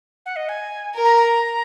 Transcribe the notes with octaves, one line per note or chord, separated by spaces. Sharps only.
F#5
D#5
G#5
A#4
A#5
A#5